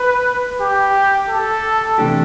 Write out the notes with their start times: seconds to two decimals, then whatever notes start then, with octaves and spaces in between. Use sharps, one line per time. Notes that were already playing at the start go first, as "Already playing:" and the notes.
Already playing: B4
0.61 G4
1.29 A4
1.98 C3 E3 A3 D4 G4